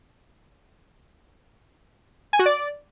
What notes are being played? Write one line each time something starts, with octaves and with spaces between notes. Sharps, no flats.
G#5
F#4
D5